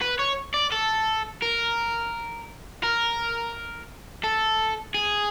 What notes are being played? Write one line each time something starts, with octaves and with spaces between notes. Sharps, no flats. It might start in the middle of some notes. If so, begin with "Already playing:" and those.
B4
C#5
D5
A4
A#4
A#4
A4
G#4